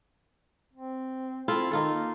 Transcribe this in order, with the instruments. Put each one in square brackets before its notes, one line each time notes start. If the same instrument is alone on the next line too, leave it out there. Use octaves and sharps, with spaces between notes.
[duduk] C4
[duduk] C4 [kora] E4 F4 A4
[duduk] D#3 [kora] D#4 F4 A4
[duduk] A#3